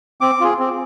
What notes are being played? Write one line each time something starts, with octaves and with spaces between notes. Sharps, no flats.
C4 D6
F4 G#4
C4